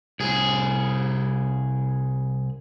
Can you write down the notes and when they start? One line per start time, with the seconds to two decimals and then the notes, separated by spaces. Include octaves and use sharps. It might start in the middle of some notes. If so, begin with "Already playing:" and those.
0.20 C2 G#4